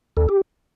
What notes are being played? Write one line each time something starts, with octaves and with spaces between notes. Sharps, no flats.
D#2 A4
G4